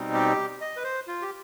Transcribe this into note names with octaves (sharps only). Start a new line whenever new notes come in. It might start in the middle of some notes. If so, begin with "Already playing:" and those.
Already playing: B2 G3 C4 D#4
G4
D#5
B4
C5
F4
G4